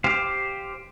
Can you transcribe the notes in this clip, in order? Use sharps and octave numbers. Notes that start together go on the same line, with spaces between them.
G4 C5 F5